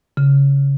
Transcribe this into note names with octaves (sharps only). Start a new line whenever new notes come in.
C#3